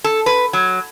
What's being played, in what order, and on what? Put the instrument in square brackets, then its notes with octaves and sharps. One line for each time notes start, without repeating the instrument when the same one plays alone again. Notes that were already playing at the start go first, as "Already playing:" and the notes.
[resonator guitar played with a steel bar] A4
B4
F#3